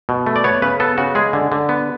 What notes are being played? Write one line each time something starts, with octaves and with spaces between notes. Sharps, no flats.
B2
A3
D5
B3 C#5
C#3 B4
B3 A4
C#3 F#4
G#3 G#4
D3
D3
B3